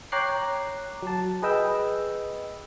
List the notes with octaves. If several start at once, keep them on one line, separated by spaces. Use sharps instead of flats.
C#5 G5 A#5 D6 F#6 C7
F#3 A5
G#4 B4 D#5 G5 E6